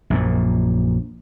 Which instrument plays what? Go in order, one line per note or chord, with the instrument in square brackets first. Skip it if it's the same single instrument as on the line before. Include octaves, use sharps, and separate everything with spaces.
[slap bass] A#1 F#2 A#2